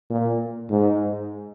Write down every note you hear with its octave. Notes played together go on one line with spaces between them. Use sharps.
A#2
G#2